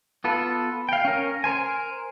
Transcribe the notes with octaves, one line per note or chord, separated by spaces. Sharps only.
B3 F4 A4 B4
F5 G5
C#4 A#4
A#4 C5 G#5